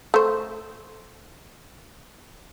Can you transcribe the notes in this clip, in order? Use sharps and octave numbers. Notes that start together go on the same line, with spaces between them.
A3 C5